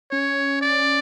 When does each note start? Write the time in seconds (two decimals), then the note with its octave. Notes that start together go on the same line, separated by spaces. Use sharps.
0.11 C#4 C#5
0.62 D5